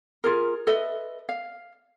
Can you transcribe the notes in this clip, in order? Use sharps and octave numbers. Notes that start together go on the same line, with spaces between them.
F4 G#4 A#4
A4 B4 D#5 E5
F5